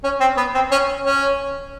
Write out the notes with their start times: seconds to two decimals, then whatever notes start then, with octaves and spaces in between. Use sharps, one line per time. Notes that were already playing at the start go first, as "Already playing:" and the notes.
0.04 C#4
0.20 C4
0.37 B3
0.54 C4
0.71 C#4
1.05 C#4